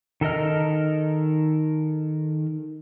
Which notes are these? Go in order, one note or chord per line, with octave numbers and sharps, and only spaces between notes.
D#3 A4 A#4 D#5 F6